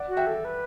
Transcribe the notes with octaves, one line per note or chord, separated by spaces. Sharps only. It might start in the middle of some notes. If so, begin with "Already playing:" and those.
Already playing: D5 F#5
F#4
E5 G5
A4
B4